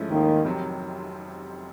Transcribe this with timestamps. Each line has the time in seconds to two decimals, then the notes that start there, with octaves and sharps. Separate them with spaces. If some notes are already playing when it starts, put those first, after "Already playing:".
Already playing: G#2 F3 A3 C#4 E4
0.10 D#2 D#3
0.45 F1 F2 C3 D#3 F#3